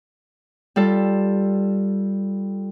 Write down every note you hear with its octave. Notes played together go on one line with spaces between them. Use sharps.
G3 F4 A4